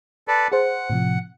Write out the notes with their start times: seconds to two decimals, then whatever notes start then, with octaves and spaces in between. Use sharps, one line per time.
0.28 A4 B4 D5
0.52 G#4 C5 F#5
0.90 A2 C3 F3